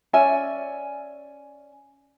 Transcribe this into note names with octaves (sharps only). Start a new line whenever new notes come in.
C#4 D5 E5 G#5